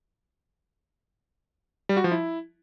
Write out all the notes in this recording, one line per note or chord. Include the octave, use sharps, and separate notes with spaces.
G3
F#4
F3
E4